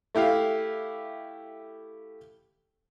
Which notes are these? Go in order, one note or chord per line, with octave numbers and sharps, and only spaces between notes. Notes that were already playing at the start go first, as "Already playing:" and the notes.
A3 E4 G4 F5